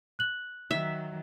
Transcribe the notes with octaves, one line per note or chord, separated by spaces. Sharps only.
F#6 F#7
D#3 F#3 E5